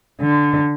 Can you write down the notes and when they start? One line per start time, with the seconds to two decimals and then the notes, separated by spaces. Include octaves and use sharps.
0.20 D3